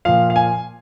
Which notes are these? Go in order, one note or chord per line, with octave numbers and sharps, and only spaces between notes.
A#2 F3 F5
F5
G#5